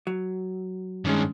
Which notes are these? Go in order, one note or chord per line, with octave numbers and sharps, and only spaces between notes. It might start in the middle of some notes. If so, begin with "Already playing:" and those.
F#3
G2 D#3 G#3 C#4 D4